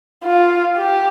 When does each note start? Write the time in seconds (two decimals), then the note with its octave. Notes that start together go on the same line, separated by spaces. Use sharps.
0.25 F4
0.77 G4